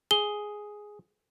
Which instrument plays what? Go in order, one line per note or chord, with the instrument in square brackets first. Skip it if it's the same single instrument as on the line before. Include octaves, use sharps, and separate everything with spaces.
[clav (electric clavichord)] G#4 [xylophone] G7